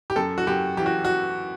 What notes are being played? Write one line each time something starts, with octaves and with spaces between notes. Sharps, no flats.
G4
F#2 A4
F#4
F#2 G4
E3 G4
F#4
E3 F#4